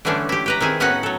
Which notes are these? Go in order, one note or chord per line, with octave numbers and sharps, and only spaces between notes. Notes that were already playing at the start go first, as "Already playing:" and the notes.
D3 E3 G3 A3 C#4 D4
E4 G4
G4 B4 A#5
D#3 C4 E4 G#4
A2 B3 C#4 D#4 F#4 F#5
F#3 A4